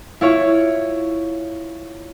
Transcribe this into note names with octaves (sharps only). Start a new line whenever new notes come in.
E4 F4 C#5